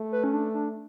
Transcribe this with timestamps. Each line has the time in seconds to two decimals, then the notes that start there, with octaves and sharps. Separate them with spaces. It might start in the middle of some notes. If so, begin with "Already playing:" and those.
Already playing: A3
0.12 B4
0.24 C#4
0.33 D4
0.54 D4